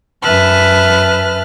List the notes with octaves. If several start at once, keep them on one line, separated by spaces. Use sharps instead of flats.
F#2 B4 E5 A5 F6 F#6